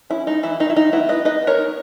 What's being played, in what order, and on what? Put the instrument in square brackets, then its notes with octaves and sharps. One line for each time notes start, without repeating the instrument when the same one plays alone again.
[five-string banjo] C#4 E4
G#3 D#4
E3 E4
D#3 D#4
E4
D#3 D#4
B3 E4
G#3 B4 D#5
D#4 B4 D#5
B3
A#4 C#5
D#4